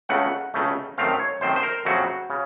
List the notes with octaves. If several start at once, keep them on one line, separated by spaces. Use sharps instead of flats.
C#2 C#3 A3 F#5
C#2 C#3 A3
F#2 D#3 A3 C4 F5
C#5
F#2 D#3 A3 C4 C5
C5
A#4
F2 C#3 F#3 A3 C4 F#4
C#3